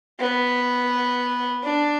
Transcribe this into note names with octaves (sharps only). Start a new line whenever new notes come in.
B3
D4